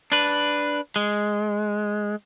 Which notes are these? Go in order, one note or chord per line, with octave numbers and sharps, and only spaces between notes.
D4 B4
G#3